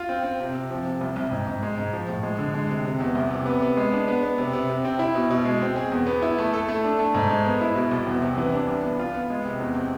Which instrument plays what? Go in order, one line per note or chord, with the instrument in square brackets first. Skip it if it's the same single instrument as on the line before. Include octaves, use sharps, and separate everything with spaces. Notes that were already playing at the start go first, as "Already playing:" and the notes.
Already playing: [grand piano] F4
C4
C4
C3
C3
F3
C3
C2
C2
G#2
G#2
G#3
G#2
F3
A2
G#3
D3
G#3
C3
C3
E2
C2
C3
B3
B3
G#3
D4
B3
B3
C3
C3
C3
C4
E4
B2
B2
G#3
C4
G#4
E2
B3
E4
A3
A4
A3
D4
A3
G#2
G#3
B3
E4
B2
C2
E2
C3
E3
D4
C2
B3
F4
B3
G#3
C3
E2
C4